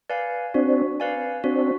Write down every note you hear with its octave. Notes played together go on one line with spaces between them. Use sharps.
B4 D5 F5 G#5
C4 D4 F#4
B4 D5 F5 G#5
C4 D4 F#4